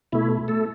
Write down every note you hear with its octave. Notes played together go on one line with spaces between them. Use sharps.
B2 A3 E4
A3 A4